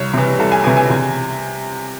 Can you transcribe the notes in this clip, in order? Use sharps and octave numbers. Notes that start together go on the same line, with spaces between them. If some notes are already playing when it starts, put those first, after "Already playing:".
Already playing: C2 C#5
C3 E3
C2 A4
G#5
C3 E3 G#5
G#5
C3